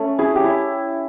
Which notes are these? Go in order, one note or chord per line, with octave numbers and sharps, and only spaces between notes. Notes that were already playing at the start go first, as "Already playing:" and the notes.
Already playing: A3 C#4
E4 G#4
G4
E4